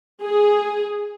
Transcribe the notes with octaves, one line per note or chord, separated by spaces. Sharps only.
G#4